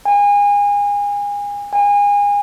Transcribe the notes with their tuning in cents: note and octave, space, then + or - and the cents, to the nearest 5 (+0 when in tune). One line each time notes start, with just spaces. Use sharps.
G#5 -30
G#5 -30